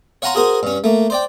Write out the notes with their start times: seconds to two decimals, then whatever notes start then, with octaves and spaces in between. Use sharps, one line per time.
0.22 C#5 F5 F#5 G#5 A#5 C6
0.35 F#4 G#4 A#4 C5 G#5
0.63 G2 C#4
0.84 A3 A#3
1.10 C5 D5 G5